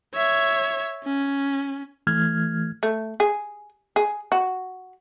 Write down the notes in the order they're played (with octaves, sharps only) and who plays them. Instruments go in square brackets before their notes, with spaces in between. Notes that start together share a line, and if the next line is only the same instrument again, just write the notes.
[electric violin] C#5 E5
C#4
[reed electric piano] E3 A3 F6 G#6
[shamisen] A3
G#4
G#4
F#4